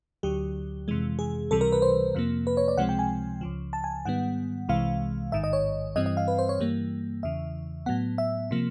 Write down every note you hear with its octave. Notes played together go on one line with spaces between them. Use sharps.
D2 D3 F#3 G4
F2 C3 E3 G#3
G#4
C#2 C3 E3 G3 A4
A#4
B4
C5
F2 C3 F3 A#3
B4
C#5
D5
C#2 C3 F3 G#3 C4 F#5
G5
G#5
C#2 C#3 F3
A5
G#5
G#2 D#3 G3 B3 F#5
C2 C3 E3 G#3 F5
A1 G#2 D#3 E5
D#5
C#5
G2 E3 G3 C4 D#5
D#5
F5
B4
C5
C#5
G2 E3 G3 A#3
E2 C#3 E3 E5
A2 F#3 B3 F#5
E5
C3 F3 A#3